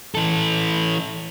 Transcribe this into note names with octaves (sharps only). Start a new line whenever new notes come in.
E3 A4